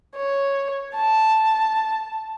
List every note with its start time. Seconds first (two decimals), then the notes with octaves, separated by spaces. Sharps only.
0.16 C#5
0.95 A5